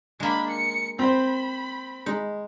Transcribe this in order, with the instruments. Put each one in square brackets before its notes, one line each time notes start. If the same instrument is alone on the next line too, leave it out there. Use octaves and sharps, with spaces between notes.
[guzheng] G#3 A#3 [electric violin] D4 B5
[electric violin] C#7
[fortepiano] C4 C5 [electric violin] B5
[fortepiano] G#3 [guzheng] D#4